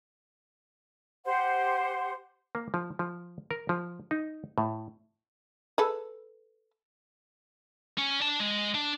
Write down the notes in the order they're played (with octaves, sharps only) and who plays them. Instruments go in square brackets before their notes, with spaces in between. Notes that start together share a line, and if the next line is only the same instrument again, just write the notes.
[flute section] G4 C5 F#5 C6
[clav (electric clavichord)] A#3
F3
F3
A#4
F3
D#4
A2
[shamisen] G#4 A4 B4
[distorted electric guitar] C#4
D4 A5
G#3
D4